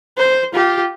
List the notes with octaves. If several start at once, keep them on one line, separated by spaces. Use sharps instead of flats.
C5
F4 G4